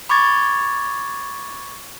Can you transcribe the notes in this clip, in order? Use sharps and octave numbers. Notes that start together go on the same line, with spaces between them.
B5 C#6 D6 G#6 A6